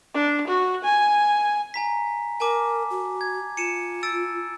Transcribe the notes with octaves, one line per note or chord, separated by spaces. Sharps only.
D4
F#4
G#5
G#5 A#5 B6
A#4 G#5 A5 D6
F#4
G#6
F4 C#7 D#7 E7
E6 A6 D7